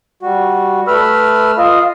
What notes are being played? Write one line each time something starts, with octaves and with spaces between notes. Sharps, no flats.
G3 F#4
A3 B4 B5 E6 F6
F4 D#5 F5